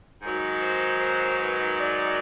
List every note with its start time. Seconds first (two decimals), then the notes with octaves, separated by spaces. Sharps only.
0.22 G#2 D#3 F#3
0.61 C5
1.01 C5
1.40 B4
1.79 D5